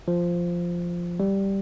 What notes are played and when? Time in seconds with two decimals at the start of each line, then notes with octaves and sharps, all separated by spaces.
0.08 F3
1.20 G3